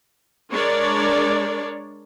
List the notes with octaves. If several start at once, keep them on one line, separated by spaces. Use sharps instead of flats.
G#3 D4 A#4 C#5 D5